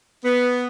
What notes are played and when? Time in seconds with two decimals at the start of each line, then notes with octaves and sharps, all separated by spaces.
0.25 B3